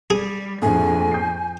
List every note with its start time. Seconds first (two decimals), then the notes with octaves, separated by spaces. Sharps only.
0.10 G3 G#4
0.62 A#1 F2 A2 G#5
1.12 G6 C7